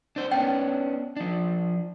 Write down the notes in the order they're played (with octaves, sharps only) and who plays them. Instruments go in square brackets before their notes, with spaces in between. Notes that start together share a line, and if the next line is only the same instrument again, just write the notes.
[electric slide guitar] D4 C5
[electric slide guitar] B3 C#4 D4 [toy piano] G5
[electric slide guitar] F3 D4